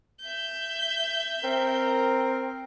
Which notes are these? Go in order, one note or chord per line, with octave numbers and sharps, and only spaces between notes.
E5 G6
C4 A#4